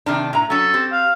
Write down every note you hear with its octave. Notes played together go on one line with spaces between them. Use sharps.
C3 D#3 D4
A2 A#5
F#3 C#4 A4
C4 G4
F5